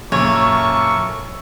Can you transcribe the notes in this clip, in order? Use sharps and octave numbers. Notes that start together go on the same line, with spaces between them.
F#2 A#2 C#3 A4 A#4 C#5 E5 C#6